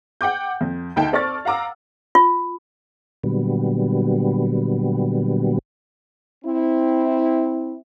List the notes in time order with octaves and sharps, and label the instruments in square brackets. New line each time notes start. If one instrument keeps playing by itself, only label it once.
[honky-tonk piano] F#5 G5 D6 G6
F2
D2 D#4 G5 A5
C4 A4 D5 C#6 F6 A6
F5 F#5 A#5 D6 E6
[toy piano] F4
[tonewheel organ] A#2 D3 F#3 G3 B3
[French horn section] C4 E4